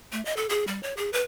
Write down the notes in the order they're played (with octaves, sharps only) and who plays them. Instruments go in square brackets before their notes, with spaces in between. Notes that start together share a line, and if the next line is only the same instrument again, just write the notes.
[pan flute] A3
D#5
A4
G#4
G3
C#5
G#4
B4